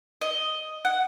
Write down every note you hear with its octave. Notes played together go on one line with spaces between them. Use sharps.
D#5
F#5